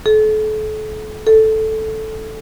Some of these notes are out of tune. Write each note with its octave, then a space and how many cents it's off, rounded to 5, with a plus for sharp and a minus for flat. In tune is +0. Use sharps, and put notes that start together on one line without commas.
A4 -35
A4 -5